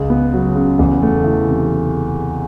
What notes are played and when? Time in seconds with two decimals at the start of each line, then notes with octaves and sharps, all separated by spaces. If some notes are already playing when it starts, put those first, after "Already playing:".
Already playing: C#2
0.10 B3
0.33 F#3
0.56 C#3
0.79 E2
1.02 A3
1.24 E3
1.48 C3